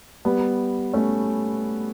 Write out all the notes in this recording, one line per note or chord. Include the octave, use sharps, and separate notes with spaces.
G3 B3
A3 C#4